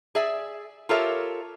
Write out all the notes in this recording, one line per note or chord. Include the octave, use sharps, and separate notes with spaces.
G#4 D5 E5 G#5
F4 G4 A4 A#4 C#5 E5